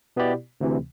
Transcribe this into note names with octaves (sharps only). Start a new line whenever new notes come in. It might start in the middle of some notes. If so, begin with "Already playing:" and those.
B2 B3 E4 G4 D5
D2 C3 E3